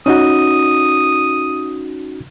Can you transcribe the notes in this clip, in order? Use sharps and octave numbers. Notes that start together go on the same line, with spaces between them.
C#4 D#4 F#4 D#6